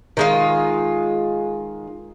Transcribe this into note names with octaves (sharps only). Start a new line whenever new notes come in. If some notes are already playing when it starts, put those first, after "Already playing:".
D#3 G#3 F4